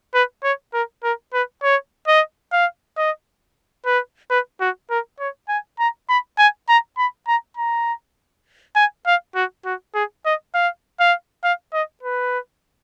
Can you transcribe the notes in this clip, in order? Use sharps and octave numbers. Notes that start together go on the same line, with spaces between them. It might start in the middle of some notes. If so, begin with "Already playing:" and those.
B4
C#5
A#4
A#4
B4
C#5
D#5
F5
D#5
B4
B4
F#4
A#4
C#5
G#5
A#5
B5
G#5
A#5
B5
A#5
A#5
G#5
F5
F#4
F#4
G#4
D#5
F5
F5
F5
D#5
B4